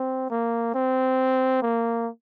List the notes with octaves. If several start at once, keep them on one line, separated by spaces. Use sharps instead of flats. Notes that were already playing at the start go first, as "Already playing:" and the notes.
Already playing: C4
A#3
C4
A#3